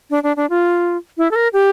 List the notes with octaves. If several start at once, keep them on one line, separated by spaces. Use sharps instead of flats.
D4
D4
D4
F4
E4
A4
A#4
G4